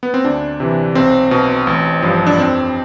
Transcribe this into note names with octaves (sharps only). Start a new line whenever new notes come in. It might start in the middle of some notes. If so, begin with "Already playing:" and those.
B3
C4
D2 D4
C3 E3
B1 C4
B2
A1
G2 F3
D4
F2 C4